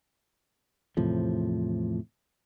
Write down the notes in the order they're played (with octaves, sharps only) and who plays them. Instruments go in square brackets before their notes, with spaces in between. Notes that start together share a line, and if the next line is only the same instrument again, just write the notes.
[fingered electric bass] E2 A2 C3 F3